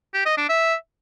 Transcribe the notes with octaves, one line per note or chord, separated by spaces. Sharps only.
G4
D#5
D4
E5